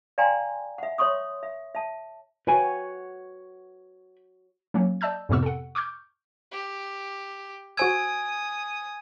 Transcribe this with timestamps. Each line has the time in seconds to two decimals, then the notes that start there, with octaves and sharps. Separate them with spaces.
0.18 D5 F5 G5 G#5 A#5 C6
0.78 E5 F#5
0.98 C#5 E5 C6 C#6 D#6
1.43 E5
1.75 E5 A5
2.47 F#4 B4 C#5 G5 G#5
4.74 F#3 A#3 C#4
5.01 D5 D#5 A5 E6 G6
5.29 F2 A2 C3 B3 C#6 E6
5.43 A4 F#5
5.75 C#6 D6 F6 G6
6.51 G4
7.77 F#4 C5 G#5 D#6 E6 G#6